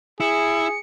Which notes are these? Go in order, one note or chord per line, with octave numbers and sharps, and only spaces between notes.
E4 G#4 C#7